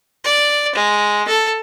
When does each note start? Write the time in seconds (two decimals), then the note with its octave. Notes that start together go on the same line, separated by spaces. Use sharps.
0.24 D5
0.75 G#3
1.28 A4